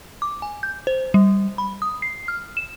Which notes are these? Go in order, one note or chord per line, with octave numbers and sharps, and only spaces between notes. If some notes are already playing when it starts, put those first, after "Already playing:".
D6
G#5
G6
C5
G3
B5
D#6
C7
F6
E7